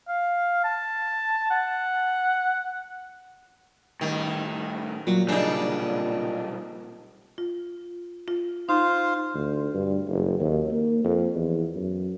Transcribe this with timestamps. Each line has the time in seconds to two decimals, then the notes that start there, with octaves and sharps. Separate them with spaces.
0.08 F5
0.64 A5
1.50 F#5
4.01 A2 D#3 G3
5.07 A#2 F#3
5.29 B1 C#3 G3 D4 D#4
7.38 F4
8.28 F4
8.69 D#4 F4 C5 F5
9.34 D2
9.74 G2
10.08 F#1
10.40 D#2
10.71 A#3
11.04 F2
11.35 E2
11.75 F#2